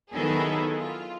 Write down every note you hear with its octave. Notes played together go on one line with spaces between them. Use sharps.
D#3 F#3 B3 E4 G#4 A4
F4